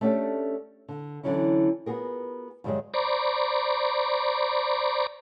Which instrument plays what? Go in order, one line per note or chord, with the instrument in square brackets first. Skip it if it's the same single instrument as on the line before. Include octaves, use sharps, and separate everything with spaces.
[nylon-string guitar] A3 C#4 D4 F#4 G4 A4
D3
D3 E3 F#3 C#4 E4
B3 F4 F#4 G#4 A#4
G2 D3 F#3 G#3 G4 G#4
[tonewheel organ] C5 D5 A#5 B5 C#6 D6